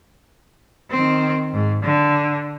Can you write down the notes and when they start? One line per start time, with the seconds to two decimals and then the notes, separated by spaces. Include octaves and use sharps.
0.91 D#3 C4
1.53 G#2
1.83 D3